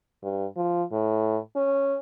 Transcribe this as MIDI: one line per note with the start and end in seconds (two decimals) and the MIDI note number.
0.23 0.46 43
0.57 0.83 53
0.92 1.38 45
1.56 1.98 61